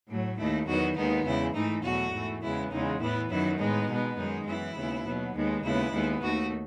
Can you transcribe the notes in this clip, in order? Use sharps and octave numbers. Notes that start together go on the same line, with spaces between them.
A2 F#3 A3
D#2 D#3 A3 E4
E2 D#3 F#3 B3 F#4
D#2 D#3 G#3 B3 D#4
E2 C#3 G#3 E4
G#2 E3 A3 D#4
E2 B2 F#3 A3 F#4
G#2 E3 A3
E2 C#3 G#3 B3 E4
E2 C#3 E3 G#3 D#4
A2 E3 B3 E4
F#2 D#3 F#3 B3 E4
A2 G#3 B3 D#4
B2 G#3 B3
F#2 D#3 G#3 D#4
F#2 E3 B3 E4
D#2 C#3 G#3 B3
B2 F#3 B3
D#2 D#3 G#3 B3
D#2 C#3 G#3 B3 E4
D#2 D#3 G#3 B3
D#2 D#3 A3 F#4